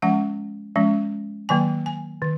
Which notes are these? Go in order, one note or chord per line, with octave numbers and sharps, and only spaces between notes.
F3 G#3 C#4 F#5
F3 G#3 C#4
D#3 F#3 A#3 G#5
G#5
D#3